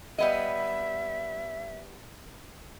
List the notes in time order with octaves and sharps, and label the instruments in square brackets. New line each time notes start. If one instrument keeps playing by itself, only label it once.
[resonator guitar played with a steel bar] G3 B3 D#5 [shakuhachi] E5